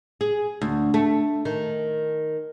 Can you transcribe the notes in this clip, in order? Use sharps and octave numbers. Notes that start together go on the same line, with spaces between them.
G#4
D2
A3
D#3